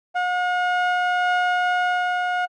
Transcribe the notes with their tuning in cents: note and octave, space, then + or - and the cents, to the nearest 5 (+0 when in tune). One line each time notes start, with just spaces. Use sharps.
F#5 -45